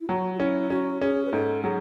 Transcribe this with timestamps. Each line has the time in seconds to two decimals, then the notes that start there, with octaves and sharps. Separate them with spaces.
0.01 E4
0.08 F#3 F#4
0.34 F#4
0.40 C#4 E4
0.70 C#4 F#4
1.01 C#4 G#4
1.26 B4
1.33 G#2 A4
1.63 F#3 G#4